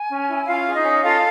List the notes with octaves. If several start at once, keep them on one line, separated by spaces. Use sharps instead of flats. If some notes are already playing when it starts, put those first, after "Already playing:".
Already playing: G#5
C#4
E4
C#4 F4 F5
G#4
D#4 D#5
C#4
F4 A4 F5